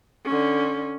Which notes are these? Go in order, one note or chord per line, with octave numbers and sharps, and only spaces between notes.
D3 C#4